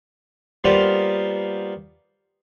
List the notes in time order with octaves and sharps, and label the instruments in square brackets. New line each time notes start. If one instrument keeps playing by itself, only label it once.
[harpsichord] G3 A#3 B3 F4 C5